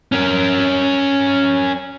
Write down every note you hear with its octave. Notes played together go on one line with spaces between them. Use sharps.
C#4 A#4